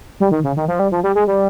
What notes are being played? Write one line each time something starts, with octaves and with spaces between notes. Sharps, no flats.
G3
D#3
C#3
D#3
F3
G3
F3
G3
G#3
G3